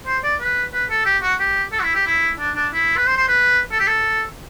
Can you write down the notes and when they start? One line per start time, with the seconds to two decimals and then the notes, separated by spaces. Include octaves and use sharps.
0.07 C5
0.23 D5
0.40 B4
0.73 B4
0.90 A4
1.06 G4
1.22 F#4
1.40 G4
1.72 A4
1.79 F#4
1.83 E4
1.95 G4
2.06 E4
2.39 D4
2.56 D4
2.73 E4
2.97 B4
3.06 C5
3.17 C5
3.28 B4
3.72 A4
3.80 G4
3.87 A4